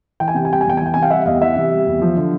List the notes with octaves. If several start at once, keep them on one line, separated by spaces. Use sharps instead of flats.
E3 G5
G#5
C3 G5
G#5
G3 G5
G#5
E2 G5
G#5
E3 G5
C3 G#5
F5 G5
G3 E5 F#5
E2 D#5 F5
E3 E5 F#5
C3
G3
E2
F3
D3